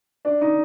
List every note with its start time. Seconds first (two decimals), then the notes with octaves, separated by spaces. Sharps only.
0.25 D4
0.41 D#4